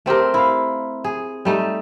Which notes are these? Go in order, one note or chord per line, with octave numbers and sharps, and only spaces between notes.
A3 C4 G4 A#4
E4 F5
G#4
G3 A3 D#4